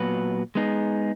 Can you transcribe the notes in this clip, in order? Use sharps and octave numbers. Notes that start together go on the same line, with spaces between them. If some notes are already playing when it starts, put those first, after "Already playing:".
Already playing: A#2 F#3 B3 F#4 B4
G#3 B3 D#4 G#4